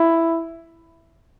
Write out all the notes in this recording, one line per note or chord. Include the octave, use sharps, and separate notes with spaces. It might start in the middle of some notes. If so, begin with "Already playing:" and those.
Already playing: E4